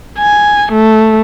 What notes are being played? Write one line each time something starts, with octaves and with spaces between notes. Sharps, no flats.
G#5
A3